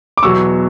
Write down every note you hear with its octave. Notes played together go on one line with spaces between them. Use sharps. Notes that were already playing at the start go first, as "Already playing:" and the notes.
D6
E2 B2 F#3 C#6 E6